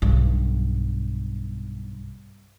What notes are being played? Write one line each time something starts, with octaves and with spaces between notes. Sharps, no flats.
B1 G2